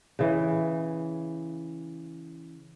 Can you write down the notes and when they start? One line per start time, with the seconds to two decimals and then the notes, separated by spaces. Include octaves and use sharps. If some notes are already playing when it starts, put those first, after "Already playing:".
0.19 C#3 E3